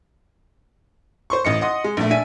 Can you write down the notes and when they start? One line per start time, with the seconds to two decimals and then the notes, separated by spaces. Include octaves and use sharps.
1.30 C5 C6 C#6
1.45 A1 D#5 C#7
1.61 D#5 F#5 C6 D#6
1.84 G#3
1.97 A#1 A3
2.10 D4 E5 G#5 D#7